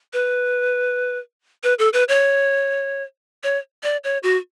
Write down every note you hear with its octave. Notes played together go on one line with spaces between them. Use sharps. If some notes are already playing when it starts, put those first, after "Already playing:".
B4
B4
A4
B4
C#5
C#5
D5
C#5
F#4